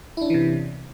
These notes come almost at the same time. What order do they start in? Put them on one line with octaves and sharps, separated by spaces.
E4 D4 C#4 E3 C3